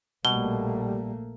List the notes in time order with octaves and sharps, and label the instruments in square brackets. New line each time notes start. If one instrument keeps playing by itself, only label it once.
[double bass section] A#1 A3 A#3 [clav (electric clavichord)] B2 [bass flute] G3 [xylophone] G7